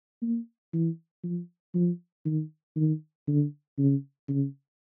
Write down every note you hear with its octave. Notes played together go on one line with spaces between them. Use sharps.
A#3
E3
F3
F3
D#3
D#3
D3
C#3
C#3